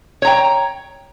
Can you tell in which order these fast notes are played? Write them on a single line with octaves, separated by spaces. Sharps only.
C#5 A#5 G5